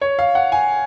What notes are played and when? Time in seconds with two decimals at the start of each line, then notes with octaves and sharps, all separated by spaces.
0.01 C#5
0.19 F5
0.35 F#5
0.52 G#5